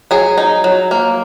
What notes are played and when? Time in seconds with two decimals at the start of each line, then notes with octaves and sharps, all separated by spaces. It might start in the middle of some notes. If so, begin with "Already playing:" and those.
0.11 F#3 G#4
0.38 D#4
0.64 F#3
0.91 A#3